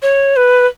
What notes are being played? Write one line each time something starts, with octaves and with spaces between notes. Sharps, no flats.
C#5
B4